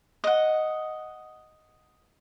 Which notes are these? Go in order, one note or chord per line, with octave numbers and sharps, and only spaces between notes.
D#5 F#5